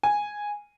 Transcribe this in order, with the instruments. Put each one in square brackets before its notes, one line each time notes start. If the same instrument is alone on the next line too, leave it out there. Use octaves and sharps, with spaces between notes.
[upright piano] G#5